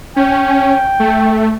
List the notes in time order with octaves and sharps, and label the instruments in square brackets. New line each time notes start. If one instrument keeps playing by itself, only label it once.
[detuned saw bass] C#4 [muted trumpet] G5
[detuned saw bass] A3